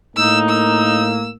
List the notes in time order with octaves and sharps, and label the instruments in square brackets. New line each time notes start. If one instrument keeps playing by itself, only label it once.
[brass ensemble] A2 A#3 [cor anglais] D#4 [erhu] E6
[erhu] E6